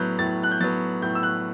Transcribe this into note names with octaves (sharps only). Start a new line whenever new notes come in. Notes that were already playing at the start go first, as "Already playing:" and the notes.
Already playing: A2 F#3 B3 F#6 G6
A2 A6
F#6
G6
F#3 B3 A6
A2 G6
E6
F#6